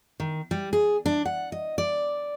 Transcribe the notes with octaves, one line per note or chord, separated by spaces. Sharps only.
D#3
G3
G#4
D4
F#5
D#5
D5